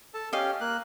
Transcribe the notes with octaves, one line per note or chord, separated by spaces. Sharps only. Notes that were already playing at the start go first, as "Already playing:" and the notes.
A4 A5
C#4 G4 D#5 F5
A#3 F#6